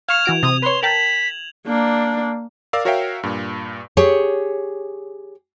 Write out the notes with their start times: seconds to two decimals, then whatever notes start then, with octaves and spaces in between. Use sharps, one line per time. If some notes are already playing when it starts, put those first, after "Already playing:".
0.09 F5 C#6 F6 G#6 E7 F7
0.25 E3 F#4 D7
0.43 C3 D#6
0.62 B4 C#5 C6
0.83 A#4 G5 A5 B6 F#7
1.67 A#3 D4
2.73 A#4 D5 F5 E6
2.85 F#4 A#4 C#5 E5 F5 G5
3.23 G2 A#2
3.97 G4 G#4 C#5